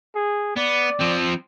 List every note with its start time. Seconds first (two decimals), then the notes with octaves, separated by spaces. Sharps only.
0.15 G#4
0.56 B3 D5
0.99 F3 C4